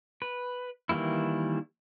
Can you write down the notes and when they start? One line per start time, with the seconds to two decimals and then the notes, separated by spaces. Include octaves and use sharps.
0.22 B4
0.89 D#3 E3 G3 A#3 E4